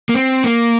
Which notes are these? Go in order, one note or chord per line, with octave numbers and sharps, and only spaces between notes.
A#3
C4
A#3